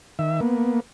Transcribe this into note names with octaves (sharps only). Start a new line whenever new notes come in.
D#3 E5
A#3 B3